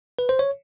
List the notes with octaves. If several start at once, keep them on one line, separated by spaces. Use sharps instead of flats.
B4
C5
C#5